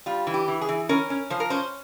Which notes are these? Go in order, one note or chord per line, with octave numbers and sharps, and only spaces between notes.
G3 F4
E3
G4
E3
G#4
E3
C#4 A#4
C#4
F3 C5
A#4
C#4 C5